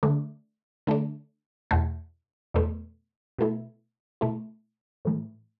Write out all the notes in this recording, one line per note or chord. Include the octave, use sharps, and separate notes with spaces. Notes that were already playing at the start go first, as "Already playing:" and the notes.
D3 A3 D4
D3 A3 D4
E2 B2 A3
E2 B2 A3
B2 A3 E4
B2 A3 E4
A2 E3 A3